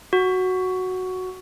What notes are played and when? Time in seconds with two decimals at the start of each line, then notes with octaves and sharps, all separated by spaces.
0.13 F#4